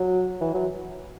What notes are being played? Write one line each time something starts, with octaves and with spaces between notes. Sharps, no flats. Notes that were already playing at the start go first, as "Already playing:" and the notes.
Already playing: F#3
E3
F#3